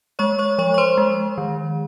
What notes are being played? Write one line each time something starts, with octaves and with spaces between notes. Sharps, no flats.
G#3 C#5 C#6
C#5 C#6
F3 C#5 C#6
C#6
C5 C6
G#3
D#3